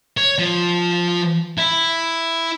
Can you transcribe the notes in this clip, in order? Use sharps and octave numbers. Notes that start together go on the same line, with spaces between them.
C#5
F3
E4